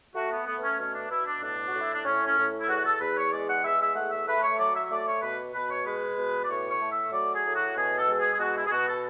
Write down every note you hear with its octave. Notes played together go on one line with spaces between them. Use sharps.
A3 F#4
B3
A3 B3
B3
C#4
B2 C#4
D4
B2 E4
D4
A2 D4
F#4
A2
E4
D4
A2 C#4
C#4
A2
E4
E2 F#4
A4
E2 B4
C#5
G#3 D5
F#5
E2 E5
E5
A3 F#5
E5
A3 B4
C#5
F#3 D5
E5
E5
A3 D5
C#5
B2 B4
B2 B4
C#5
G#3 B4
B2
D5
A2 C#5
C#5
A3
E5
F#3 D5
G#4
A2
F#4
B2 G#4
A4
G#3
A4
G#4
G#4
B2 F#4
E4
G#4
B2 F#4
A4